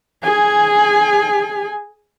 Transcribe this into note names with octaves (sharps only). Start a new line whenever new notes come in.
G#4 G#5